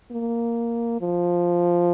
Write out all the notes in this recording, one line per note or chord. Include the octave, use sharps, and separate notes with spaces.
A#3
F3